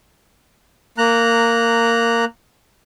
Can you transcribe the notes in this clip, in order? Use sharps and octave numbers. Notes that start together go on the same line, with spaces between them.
A#3 A#5 F#6